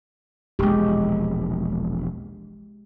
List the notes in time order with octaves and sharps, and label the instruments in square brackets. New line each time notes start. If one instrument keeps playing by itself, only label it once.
[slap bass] E1 A#1 [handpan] G#3 G4